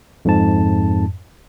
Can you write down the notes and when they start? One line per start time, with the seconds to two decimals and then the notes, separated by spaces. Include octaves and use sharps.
0.25 F2 G#2 A5